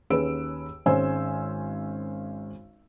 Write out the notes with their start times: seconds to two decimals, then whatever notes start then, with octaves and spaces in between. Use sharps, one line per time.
0.10 D#2 C#4 G#4 B4 E6 D7
0.86 G#1 G#3 C#4 C5 G#5 E6